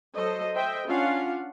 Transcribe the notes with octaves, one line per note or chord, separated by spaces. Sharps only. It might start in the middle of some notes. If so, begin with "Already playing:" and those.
F#3 A4 C5 D#5
C5 D#5 E5 G5
C#4 D4 F4 F5 F#5